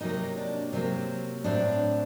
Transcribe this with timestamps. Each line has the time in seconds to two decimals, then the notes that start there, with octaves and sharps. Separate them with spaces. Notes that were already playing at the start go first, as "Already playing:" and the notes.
0.01 C3 F#3 A#3 D#4
0.37 D4
0.73 C3 F#3 A#3 C4
1.44 A2 F#3 C4 D4